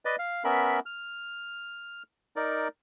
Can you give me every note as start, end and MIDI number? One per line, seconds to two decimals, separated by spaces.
0.05 0.16 71
0.05 0.16 74
0.05 0.16 75
0.19 0.44 77
0.44 0.80 59
0.44 0.80 61
0.44 0.80 70
0.44 0.80 76
0.44 0.80 83
0.86 2.03 89
2.36 2.68 63
2.36 2.68 70
2.36 2.68 74